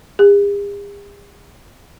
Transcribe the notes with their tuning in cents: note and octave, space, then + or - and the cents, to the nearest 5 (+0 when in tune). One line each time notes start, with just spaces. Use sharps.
G#4 -45